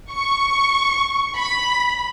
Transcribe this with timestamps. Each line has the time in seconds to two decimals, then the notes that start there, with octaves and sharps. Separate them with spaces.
0.12 C#6
1.36 B5